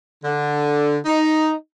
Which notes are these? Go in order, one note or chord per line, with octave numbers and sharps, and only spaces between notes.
D3
D#4